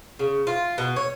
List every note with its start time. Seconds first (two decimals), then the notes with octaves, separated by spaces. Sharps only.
0.19 C#3
0.47 F4
0.78 B2
0.96 C#5